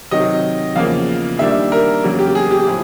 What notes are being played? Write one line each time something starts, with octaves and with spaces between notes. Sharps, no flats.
C3 D#3 F#3 D#5
E2 C#3 F3 A#3 F5
D#3 G3 A#3 D4 E5
A#4
E2 C#3 F#3 A#3 C#4
G4
G#4
G4
A2 F3 G#4